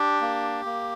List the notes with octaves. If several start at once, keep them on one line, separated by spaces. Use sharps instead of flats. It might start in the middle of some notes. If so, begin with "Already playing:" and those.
Already playing: D4 G4
A#3
A#3